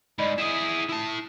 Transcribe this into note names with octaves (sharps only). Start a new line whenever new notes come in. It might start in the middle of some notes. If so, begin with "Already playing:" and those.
G#2 D5 D#5 B5
E4 G#4 D#6 E7
E4 A5